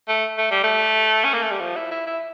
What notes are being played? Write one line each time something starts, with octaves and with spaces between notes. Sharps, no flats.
A3
A3
G3
A3
C#4
A#3
A3
G3
F3
E4
E4
E4